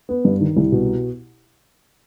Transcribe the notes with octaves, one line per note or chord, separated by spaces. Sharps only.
B3
G2
D#3
C2
B2